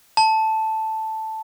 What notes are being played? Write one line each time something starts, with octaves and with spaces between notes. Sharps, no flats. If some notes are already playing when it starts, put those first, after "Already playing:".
A5